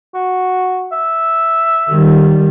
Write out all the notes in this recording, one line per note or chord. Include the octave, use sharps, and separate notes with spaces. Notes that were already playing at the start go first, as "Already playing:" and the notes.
F#4
E5
D#3 G3